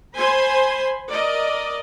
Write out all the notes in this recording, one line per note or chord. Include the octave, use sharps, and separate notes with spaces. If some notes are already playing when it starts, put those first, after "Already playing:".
C5 G#5 B5 C6
A#4 D5 D#5